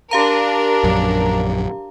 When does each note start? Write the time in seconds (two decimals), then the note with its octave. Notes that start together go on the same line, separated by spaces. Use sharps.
0.11 D4 G4 A#4 F5 A#5
0.84 A#1 F#2